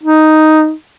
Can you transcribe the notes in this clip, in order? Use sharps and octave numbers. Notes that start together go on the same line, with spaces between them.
D#4